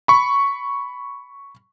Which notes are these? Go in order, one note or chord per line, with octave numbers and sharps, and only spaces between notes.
B5 C#6